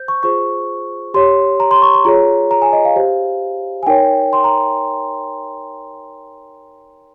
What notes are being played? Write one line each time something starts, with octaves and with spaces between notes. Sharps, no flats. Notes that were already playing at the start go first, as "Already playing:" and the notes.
Already playing: C5 G6
C#6
F4 G#4 C5 C#6
G4 C#5 C6
A#5
C6
C#6
C6
F4 G#4 C#5 A#5
A#5
G#5
D#5
F5
G4 C5
G#5
D#4 A#4 C#5 G5
C6
A#5